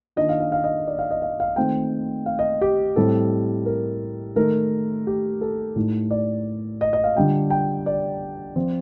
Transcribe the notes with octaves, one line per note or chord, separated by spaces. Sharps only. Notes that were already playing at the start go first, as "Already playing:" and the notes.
D#3 A#3 D4 F4 D#5
F5
F5
F5
D#5
D5
F5
D#5
F5
F5
D#3 A3 C4 F4 G5
F5
D#5
G4
A2 G3 C4 A4
A#4
D#3 A3 D#4 A#4
G4
A4
A2 A3 D#4
D5
D#5
D#5
F5
D3 G3 D4 F4 G5
G5
D5
F3 C4 F4